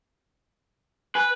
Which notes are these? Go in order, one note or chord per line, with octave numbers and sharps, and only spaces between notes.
B4 G#5 F#6